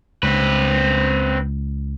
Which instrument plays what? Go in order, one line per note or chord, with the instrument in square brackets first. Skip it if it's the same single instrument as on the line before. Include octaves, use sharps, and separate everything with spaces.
[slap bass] C#2 [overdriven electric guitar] C4 B4